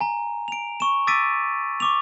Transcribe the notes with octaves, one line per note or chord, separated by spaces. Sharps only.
G#5 A#5
D7 F7
C#6 E7
D6 E6 A6 B6 D7 D#7
C#6 D6 F7